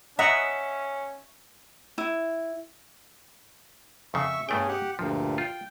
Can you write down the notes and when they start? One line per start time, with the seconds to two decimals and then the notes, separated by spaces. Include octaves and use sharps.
0.19 C#4 D#5 E5 F#5 A#5
1.98 E4
4.14 F2 C#3 E5 C#6
4.49 G2 B2 A3 C#4 G#4 G5
4.68 G4 F#5
4.99 D2 G2 A#2 F3
5.38 F4 G5